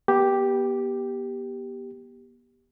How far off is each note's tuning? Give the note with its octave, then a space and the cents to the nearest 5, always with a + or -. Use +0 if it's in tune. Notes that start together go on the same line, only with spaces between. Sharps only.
B3 -30 G4 +0